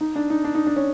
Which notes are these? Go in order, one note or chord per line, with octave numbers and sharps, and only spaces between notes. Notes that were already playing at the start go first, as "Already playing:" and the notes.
D#4
D4
D#4
D4
D#4
D4
C#4